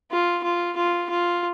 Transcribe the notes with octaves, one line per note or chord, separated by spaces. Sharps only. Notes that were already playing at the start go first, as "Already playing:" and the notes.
F4
F4
F4
F4